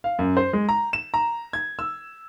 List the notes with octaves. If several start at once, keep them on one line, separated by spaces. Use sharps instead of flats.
F5
F#2
C5
G#3
A#5
E7
A#5
G#6
E6